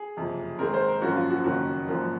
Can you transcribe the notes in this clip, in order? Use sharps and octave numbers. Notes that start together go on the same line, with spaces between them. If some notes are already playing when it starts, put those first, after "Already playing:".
Already playing: G#4
F#1 F2 C3
G#2 D#3 G#3 C4 A#4
C5
A#4
G#1 F#2 F3 A#3 C#4 F#4
F4
F#4
F#1 F2 D#3 A#3 C#4 F#4
G#1 F#2 F3 A#3